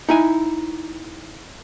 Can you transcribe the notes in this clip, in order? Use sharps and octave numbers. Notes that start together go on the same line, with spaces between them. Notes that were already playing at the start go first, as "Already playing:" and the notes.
D#4 E4 G#5